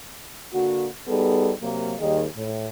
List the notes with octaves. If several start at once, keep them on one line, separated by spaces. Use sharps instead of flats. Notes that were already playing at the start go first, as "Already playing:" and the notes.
D3 A#3 F#4
G3 B3 D#4 G#4 A4
C3 F#3 A#3
D#2 D#3 G3 G#4 D#5
A2